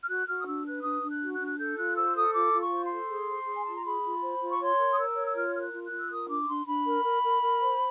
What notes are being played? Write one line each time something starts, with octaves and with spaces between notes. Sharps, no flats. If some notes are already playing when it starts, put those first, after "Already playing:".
F6
F#4 F#6
F#4 F6
D#6
D4 E6
B4 F#6
D4 D#6
D4
F#6
F#4
F#6
D4
F#6
A4 G6
F4 F#6
C5 E6
A4 D#6
F4 D6
F4
C#6
C5
C6
A4
G#4
C5
G#4
G#5
F4 A5
A#5
G#4 B5
F4
C5
F4
C#6
C#5 C6
A#4
D#6
A#4 E6
C#5
E6
F4 F6
A#4 F6
F#6
F4
F#6
F4
E6
A#4 D#6
D4 D6
C#6
D4 C6
D4 B5
A#4
A#4
A#4
A#4
C5